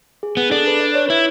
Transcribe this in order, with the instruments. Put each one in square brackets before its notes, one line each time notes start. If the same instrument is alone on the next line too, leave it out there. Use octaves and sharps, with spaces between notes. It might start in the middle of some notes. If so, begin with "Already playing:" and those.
[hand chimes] G#4
[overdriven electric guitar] B3 [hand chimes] G#4
[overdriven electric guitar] D4 [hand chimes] A4
[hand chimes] B4
D5
C#5
[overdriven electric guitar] E4 [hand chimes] B4